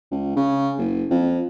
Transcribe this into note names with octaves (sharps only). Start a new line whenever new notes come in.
C#2
C#3
F#1
F2